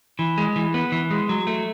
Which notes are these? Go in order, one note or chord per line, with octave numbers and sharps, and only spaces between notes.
E3
G#3
E3
B3
E3
G#3
F#3
A3